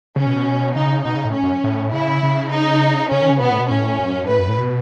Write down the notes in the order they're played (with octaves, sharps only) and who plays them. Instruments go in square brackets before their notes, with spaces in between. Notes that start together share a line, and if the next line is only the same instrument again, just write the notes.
[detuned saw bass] C#3 [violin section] C#4
[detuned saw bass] B2
B2
[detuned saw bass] C#3 [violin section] D#4
[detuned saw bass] B2 [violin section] D#4
[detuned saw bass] C#3
A2
[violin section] C#4
[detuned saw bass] F#2
A2
[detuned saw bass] C#3 [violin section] E4
[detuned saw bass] C#3
[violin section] D#4
[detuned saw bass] C#3 [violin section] C#4
[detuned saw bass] D#3
C#3
[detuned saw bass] B2 [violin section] B3
[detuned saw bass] A2
B2
[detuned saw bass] A2 [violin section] C#4
[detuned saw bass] F#2
[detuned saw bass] A2 [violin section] B4
[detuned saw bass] F#2
A2
B2